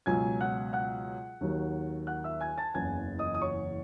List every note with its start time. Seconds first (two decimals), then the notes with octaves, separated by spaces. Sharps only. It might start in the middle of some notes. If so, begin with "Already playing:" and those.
0.06 C#2 B2 F#3 G#5 G#6
0.41 F#5 F#6
0.73 F#5 F#6
1.41 D#2 D#3 F#3
2.07 F#5 F#6
2.24 E5 E6
2.41 G#5 G#6
2.58 A5 A6
2.74 F#1 E2 C#3 E3 G#5 G#6
3.19 D#5 D#6
3.34 D#6
3.42 C#5 C#6